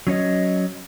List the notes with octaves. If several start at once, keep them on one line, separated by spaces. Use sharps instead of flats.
F#3 C#4 C#5 D#5